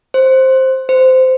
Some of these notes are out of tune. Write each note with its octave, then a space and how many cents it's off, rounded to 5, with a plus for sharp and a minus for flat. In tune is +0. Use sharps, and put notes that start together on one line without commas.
C5 +5
C5 -15